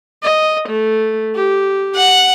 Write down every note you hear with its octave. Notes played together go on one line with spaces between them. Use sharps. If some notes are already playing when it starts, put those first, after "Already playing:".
D#5
A3
G4
F#5